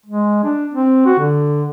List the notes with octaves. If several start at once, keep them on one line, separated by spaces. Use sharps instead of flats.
G#3
D4
C4
F#4
D3